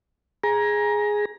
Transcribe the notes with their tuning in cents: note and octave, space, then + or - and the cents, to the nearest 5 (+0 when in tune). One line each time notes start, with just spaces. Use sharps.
G#4 +0 A#5 +20